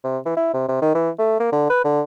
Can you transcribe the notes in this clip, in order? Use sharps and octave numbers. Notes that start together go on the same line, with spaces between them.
C3
E3
E4
C3
C3
D#3
E3
A3
A#3
D3
B4
D3